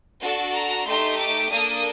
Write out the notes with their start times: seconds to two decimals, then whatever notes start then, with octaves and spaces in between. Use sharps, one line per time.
0.22 D4 F#4 A4 A5
0.54 A#5
0.85 A3 D#4 G4 C6
1.17 D6
1.50 A#3 D4 A4 D#6